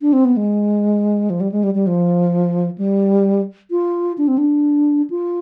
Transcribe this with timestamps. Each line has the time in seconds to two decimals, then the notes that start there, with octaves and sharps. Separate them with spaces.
0.01 D4
0.13 C4
0.25 B3
0.37 G#3
1.30 F3
1.41 G3
1.52 G#3
1.63 G3
1.74 G3
1.87 F3
2.78 G3
3.71 F4
4.18 D4
4.28 C4
4.38 D4
5.10 F4